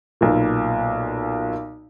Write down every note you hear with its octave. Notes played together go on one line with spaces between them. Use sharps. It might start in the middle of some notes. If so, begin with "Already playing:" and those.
B1 A#2